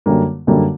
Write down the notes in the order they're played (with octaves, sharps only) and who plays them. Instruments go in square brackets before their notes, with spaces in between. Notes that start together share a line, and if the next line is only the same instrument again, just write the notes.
[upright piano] F#2 D3 G3 A#3
F#2 D3 G3 A#3